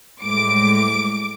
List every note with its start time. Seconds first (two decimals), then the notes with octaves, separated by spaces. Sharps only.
0.23 A2 G3 G#3 D6 D7